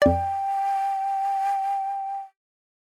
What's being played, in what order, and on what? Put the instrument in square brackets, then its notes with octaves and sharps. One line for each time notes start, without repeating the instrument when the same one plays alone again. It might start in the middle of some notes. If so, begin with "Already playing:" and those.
[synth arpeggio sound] F2 D5 [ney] G5